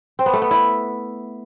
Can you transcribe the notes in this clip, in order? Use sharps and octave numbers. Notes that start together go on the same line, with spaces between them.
C4
B3
A3
B3
E4